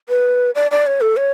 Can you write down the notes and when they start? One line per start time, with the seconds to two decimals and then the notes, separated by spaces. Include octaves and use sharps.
0.09 B4
0.55 D5
0.71 D5
0.87 C#5
1.01 A4
1.17 C#5